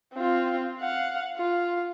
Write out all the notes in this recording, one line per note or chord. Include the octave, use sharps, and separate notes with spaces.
C4 F4
F5 F#5
F4